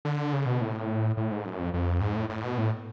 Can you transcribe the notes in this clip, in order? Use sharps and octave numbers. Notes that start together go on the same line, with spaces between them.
D3
C#3
B2
A2
A2
G#2
F#2
F2
F2
G#2
A2
A2
B2
A2